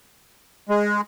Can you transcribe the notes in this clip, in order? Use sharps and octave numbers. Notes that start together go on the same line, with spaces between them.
G#3